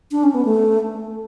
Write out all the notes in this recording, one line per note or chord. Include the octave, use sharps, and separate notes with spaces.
D4
C#4
B3
A3